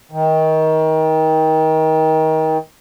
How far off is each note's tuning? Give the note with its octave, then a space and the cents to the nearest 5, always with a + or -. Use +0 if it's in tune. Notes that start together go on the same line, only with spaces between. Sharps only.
D#3 +25